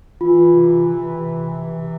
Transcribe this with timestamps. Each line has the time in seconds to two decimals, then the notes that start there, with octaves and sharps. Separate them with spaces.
0.21 E3 F4
0.52 C3
0.83 E3
1.16 C3
1.47 E3
1.78 C3